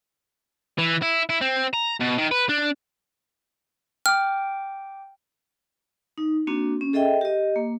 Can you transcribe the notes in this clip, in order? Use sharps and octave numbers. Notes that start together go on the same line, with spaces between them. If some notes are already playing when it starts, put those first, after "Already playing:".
E3
E4
E4
C4
A#5
B2
D#3
B4
D4
G5 D6 F6
D#4
A#3 C4 D4 F#4
C#4
G#4 A4 D#5 E5 G5
G4 D#5
A#3